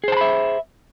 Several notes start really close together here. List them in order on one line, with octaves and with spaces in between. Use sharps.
G#4 C5 A5 B5 E5